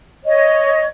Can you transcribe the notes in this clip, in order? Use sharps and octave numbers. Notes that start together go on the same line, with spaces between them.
C#5 D#5